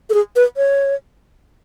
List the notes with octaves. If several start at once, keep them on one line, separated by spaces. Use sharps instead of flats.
A4
G#4
B4
C#5